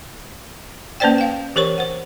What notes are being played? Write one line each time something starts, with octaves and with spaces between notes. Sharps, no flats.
A#3 C#4 B4 C5 D5 G5
F5 G5
E3 G4 A#4 C5 C#5 C#6
C5 F#5